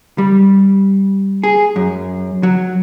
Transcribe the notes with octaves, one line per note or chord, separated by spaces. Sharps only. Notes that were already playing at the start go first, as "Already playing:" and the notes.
G3
G#4
F#2
F#3